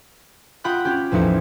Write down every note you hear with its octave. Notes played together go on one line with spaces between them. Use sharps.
F4 F#5 G5 B5 D#6 F#6
C#4 G4
A1 E2 F3 D#4 E4 C#7